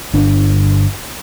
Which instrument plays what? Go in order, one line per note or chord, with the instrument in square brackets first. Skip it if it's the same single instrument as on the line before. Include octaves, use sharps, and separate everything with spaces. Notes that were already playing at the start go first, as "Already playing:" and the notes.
[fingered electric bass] G1 D4